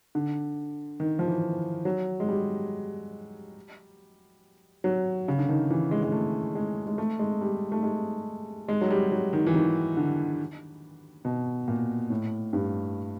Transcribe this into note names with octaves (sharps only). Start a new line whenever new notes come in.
D3
D#3
F3
E3
F#3
G#3
G3
F#3
C#3
D3
D#3
E3
G#3
G#3
A3
G#3
G#3
A3
G#3
G3
A3
G#3
G#3
F#3
G3
F#3
D#3
E3
D#3
D3
B2
A#2
A2
G2